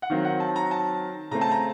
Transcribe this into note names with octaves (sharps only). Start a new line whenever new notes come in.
F#5
D#3 F#3 C4 F5
F#5
A5
A#5
A5
C#3 A3 C4 A#5
A5
A#5